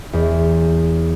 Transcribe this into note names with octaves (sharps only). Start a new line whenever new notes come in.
E2